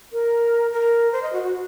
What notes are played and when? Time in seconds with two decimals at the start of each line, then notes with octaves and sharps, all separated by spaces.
0.12 A#4
0.72 A#4
1.12 C5
1.23 D#5
1.33 F#4
1.43 F#4